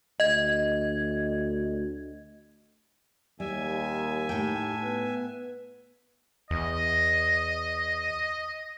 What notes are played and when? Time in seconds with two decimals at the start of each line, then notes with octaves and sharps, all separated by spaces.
0.20 D2 D#5 G#6
3.40 D#2 G3 E5 G#5
4.29 A2 D#4 G4 G5 A5
4.82 B3 B4
6.51 E2 D#5